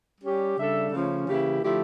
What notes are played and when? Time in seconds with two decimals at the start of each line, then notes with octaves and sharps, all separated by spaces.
0.21 G3 C#4 G4
0.57 C#3 G3 D4 A4 E5
0.91 C#3 F3 A3 C#4
1.27 C#3 E3 A#3 E4 G4
1.62 D3 F3 A3 E4 G4